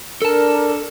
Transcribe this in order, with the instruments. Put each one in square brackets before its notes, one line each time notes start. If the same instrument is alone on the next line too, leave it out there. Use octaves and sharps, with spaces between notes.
[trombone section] D4 [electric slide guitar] A4 A5 [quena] A#4